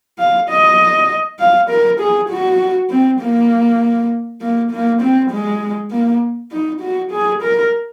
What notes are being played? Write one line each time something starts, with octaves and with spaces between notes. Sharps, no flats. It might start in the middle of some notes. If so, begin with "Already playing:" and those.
F5
D#5
F5
A#4
G#4
F#4
C4
A#3
A#3
A#3
C4
G#3
A#3
D#4
F#4
G#4
A#4